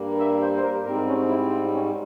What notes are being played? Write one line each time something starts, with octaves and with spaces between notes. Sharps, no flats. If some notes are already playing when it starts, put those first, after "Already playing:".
Already playing: G2 G3 A#3
E5
C5
C5
A#4
G#2 G3 C4 A#4
C#4
E4
F4
C4
C#4